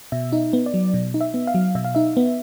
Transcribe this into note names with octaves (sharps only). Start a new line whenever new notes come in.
B2 E5
D#4
B3
D5
F#3
B2
D#4
E5
B3
F5
F#3
B2 E5
F5
D#4 E5
B3